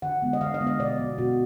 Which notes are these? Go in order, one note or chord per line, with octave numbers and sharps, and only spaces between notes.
D3 F#5
G#3 B3
D#5
D3 F5
D#5
G#3 B3
D#5
B2 D5
F#3 B3
B2 F#4